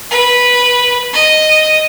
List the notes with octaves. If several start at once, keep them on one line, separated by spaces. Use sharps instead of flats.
B4
D#5